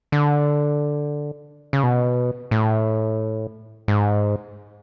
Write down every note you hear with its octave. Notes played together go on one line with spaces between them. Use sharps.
D3
C#3
B2
A2
G#2